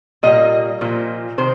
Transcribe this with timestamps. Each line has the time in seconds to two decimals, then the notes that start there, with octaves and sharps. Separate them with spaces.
0.23 A#2 G3 A#3 D#5
0.81 A#2 F3 A#3
1.38 C3 D#3 C5